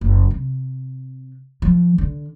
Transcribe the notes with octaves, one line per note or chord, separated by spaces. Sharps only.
F#1
C3
F3
D3